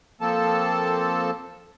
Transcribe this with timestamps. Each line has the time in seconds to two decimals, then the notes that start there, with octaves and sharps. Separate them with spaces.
0.21 F3 A#3 C4 A4 A5